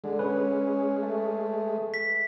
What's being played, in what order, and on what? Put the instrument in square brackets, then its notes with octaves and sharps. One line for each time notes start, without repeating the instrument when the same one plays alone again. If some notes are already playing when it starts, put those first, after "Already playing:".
[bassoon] D3 [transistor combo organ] G#3
[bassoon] C#4 [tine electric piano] B4
[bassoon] A3
[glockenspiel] B6